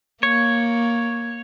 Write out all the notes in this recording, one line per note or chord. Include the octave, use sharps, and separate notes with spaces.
A#3 C#5